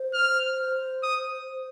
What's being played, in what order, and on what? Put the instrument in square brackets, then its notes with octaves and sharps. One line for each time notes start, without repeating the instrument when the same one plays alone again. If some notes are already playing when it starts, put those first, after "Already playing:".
Already playing: [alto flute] C5
[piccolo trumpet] F6
D#6